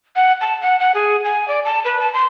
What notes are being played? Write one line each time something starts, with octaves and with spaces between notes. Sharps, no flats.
F#5
A5
F#5
F#5
G#4
G#5
D5
A5
B4
A5
C6